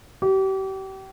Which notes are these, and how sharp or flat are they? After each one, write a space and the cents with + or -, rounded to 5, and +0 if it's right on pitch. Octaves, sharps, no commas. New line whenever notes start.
G4 -35